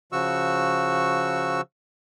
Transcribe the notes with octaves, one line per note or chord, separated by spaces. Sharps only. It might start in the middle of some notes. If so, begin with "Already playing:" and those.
C#3 F3 F#4 C#6 E6